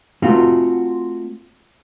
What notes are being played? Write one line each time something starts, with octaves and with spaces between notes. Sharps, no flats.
A3 C4 F4 F#4